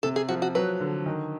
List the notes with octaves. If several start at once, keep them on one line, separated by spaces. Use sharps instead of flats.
C3 A4
G#4
F3 F#4
F#4
F#3 B4
D3
D#3